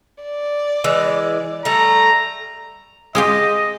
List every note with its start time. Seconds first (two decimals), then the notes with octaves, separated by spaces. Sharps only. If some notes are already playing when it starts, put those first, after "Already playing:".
0.23 D5
0.84 E3 G#3
1.65 G3 A3 A#5
3.15 G#3 F4 G4 D#5